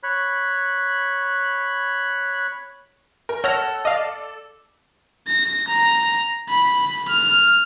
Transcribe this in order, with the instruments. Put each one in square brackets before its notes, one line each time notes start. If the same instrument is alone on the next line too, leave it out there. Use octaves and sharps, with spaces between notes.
[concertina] C#5 B5 F#6
[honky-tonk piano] A#4
[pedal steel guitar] A4 [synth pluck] C#5 F6 A#6 [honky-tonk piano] F#5
[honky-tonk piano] D5 [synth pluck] D#5 F5
[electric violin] A#6
A#5
B5
F6